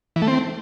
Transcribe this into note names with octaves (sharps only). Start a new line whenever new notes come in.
E3
A3
C4